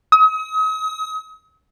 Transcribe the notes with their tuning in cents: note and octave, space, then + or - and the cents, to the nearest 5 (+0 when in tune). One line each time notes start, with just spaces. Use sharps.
D#6 +40